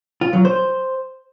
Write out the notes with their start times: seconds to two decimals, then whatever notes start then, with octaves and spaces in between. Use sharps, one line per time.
0.21 F4
0.33 F#3
0.45 C5